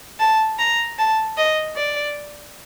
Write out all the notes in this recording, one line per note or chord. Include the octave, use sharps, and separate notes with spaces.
A5
A#5
A5
D#5
D5